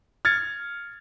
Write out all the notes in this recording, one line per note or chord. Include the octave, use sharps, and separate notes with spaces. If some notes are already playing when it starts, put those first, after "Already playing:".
F6 G#6 A6 C#7